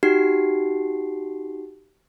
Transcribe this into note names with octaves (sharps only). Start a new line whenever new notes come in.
D#4 F#4 G4 C7